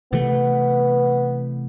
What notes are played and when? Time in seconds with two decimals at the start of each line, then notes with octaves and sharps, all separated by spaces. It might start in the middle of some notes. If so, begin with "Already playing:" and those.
0.13 C3 E3 A3 B3